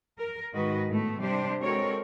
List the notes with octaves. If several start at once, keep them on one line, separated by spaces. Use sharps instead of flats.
A#4
G#2 D#3 F#4 B4 D#5
A2 A3 B3
C3 G3 D4 G4 C5
G#3 C4 F#4 A4 A#4 C#5